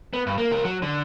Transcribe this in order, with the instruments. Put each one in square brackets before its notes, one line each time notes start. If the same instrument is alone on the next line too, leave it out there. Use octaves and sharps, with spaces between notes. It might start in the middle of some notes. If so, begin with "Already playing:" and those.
[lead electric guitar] B3
G2
A#3
C#2 A#4
F#3
D3